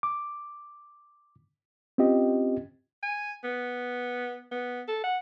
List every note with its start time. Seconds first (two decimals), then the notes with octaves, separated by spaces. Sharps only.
0.03 D6
1.98 C4 C#4 F4 G4 D#5
3.03 G#5
3.44 B3
4.52 B3
4.88 A4
5.04 F#5